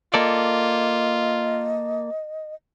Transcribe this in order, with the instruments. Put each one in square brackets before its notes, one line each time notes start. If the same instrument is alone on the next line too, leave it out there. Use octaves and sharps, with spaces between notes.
[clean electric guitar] A#3 A4 D5 [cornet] F4 [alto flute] D#5